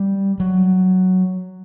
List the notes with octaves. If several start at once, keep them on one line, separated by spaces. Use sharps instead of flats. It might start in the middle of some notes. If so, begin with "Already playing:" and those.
Already playing: G3
F#3